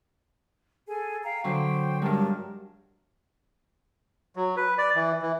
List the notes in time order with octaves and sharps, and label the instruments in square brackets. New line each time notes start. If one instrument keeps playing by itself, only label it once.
[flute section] G#4 A4 G#5
F5 G5 A#5
[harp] D3 F#3 [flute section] C5 G5
[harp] G2 G#3 [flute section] A#4 A5
[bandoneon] F#3
B4
D5
E3
E3